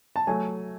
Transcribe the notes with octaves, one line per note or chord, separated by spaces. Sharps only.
A5
F#3 A3 G#5